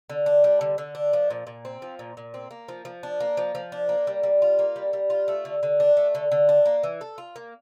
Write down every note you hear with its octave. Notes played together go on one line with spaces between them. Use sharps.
D3
D4
G3
D3
D3
D4
F3
A#2
A#2
C4
F3
A#2
A#2
C4
A#3
F3
F3
D4
A#3
F3
F3
D4
A#3
G3
G3
F4
A#3
G3
G3
F4
A3
D3
D3
D4
A3
D3
D3
D4
A#3
E3
A4
F4
A#3